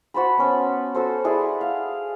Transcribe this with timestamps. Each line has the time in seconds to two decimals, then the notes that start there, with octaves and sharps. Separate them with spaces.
0.14 F#4 C5 A5 B5
0.38 B3 C#4 A5
0.95 F#4 A4 C5
1.24 E4 G#4 B4 D5
1.61 F5